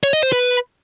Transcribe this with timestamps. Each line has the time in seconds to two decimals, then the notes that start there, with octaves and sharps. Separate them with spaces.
0.04 C#5
0.13 D#5
0.23 C5
0.32 B4